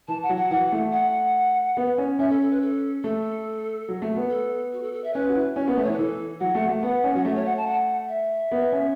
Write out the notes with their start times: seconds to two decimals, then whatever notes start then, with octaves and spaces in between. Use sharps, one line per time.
0.08 E3 A5
0.23 F#5
0.29 F#3
0.36 F#5
0.51 E3 F#5
0.72 A3
0.92 F#5
1.77 B3
1.98 C#4
2.19 C#4 E5
2.30 A4
2.41 A4
2.51 B4
2.62 A4
3.03 A3 A4
3.89 F#3
4.02 A3
4.16 B3
4.30 A4
4.73 F#4
4.83 A4
4.93 A4
5.04 E5
5.14 C#4 B4
5.29 F#4
5.35 E4
5.56 C#4 F#4
5.67 B3
5.77 A3 E5
5.84 C#5
5.88 E3
5.92 B4
5.98 E3 A4
6.40 F#3 F#5
6.55 A3
6.69 A3
6.83 B3 F#5
7.04 C#4
7.15 F#3 F#5
7.24 A3 E5
7.36 C#5
7.46 F#5
7.57 A5
7.67 F#5
8.09 E5
8.52 B3
8.72 C#4